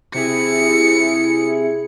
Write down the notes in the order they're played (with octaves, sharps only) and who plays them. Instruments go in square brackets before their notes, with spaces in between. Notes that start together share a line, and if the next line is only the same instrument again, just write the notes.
[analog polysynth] C3 E4 G#4 [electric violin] C#7